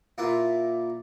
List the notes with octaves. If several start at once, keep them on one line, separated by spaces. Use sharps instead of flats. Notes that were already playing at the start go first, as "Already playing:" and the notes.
A#2 A#3 E4 F4 C6